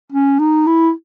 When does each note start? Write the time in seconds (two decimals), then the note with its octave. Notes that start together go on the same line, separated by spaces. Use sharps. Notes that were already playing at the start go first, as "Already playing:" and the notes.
0.12 C#4
0.39 D#4
0.67 E4